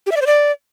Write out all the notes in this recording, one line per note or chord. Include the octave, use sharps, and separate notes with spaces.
G4
E5
D5
C5
D5